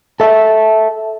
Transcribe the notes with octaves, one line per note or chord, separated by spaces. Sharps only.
A4 E5